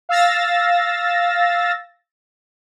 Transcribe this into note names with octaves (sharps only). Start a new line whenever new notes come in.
F5 E6 A6 A#6